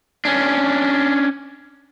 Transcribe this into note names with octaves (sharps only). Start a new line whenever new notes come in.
C#4 D4